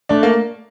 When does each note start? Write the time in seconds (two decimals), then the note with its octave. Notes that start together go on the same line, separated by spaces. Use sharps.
0.09 A3 D4
0.23 A#3